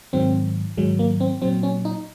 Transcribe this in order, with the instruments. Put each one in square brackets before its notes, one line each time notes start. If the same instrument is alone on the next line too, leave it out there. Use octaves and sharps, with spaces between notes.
[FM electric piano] G#2 D#3 F#3 C4
G#2 D#3 F#3 G#3
A#3
C4
A#2 F#3 C4
C#4
D#4